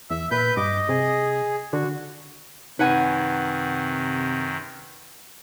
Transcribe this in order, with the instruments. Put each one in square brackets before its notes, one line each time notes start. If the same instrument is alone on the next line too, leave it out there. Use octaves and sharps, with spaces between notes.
[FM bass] E2 [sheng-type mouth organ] E5 [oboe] E6
[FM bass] A#2 [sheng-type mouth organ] B4 G6 [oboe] B5
[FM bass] G2 [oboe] D#5 [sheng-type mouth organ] D6
[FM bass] C3 [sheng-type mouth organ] G#4
[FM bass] D3 [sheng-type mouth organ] F#4
[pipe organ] F#2 D#3 [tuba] C3 [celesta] D#4 [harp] B4 F#5 G#5